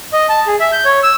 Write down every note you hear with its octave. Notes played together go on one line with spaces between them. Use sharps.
D#5
A5
G#4
E5
G6
C#5
E6